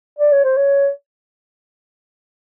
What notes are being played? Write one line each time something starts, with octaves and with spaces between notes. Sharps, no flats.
D5
C#5
C5
C#5